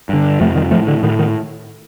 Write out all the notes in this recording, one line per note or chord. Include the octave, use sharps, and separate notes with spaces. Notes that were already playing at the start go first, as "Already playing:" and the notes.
G2 D3
F2 C3 F3 A3
D#3 G3
A2 F3 A3
D3
A2 D#3
D#3